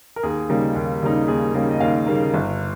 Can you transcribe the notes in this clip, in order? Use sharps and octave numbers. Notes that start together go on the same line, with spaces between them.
A#4
D#2 G#4
C#3 G3 A#3 D#4
D#2
C#3 G3 A#3 D#4
D#2 G#4
C#3 G3 A#3 D#4
D#5
D#2 F5
C#3 G3 A#3 D#4
G1